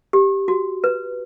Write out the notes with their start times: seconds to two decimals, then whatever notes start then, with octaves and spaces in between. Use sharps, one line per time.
0.13 G4
0.48 F#4
0.84 B4